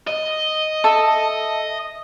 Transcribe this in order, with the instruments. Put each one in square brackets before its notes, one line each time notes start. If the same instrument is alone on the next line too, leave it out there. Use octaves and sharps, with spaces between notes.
[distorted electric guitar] D#5
[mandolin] A4 E5 D#6